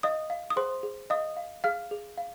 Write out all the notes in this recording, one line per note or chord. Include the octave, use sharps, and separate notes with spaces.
D#5 F5 D#6
F5
D#6
G#4 C5 C6
G#4
D#5 F5 D#6
F5
G#4 F5 F6
G#4
F5